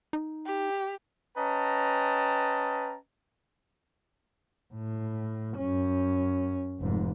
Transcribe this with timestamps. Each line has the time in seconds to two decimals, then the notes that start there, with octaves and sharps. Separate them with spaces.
0.13 D#4
0.46 G4
1.37 C#4 B4 D#5 G5 A5 A#5
4.74 A2
5.57 F#2 C#4
6.80 F1 G#2